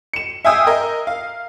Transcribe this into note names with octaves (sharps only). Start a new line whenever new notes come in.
C#7 E7
E5 F5 G5 G#5 D#6 E6
A#4 D#5
F5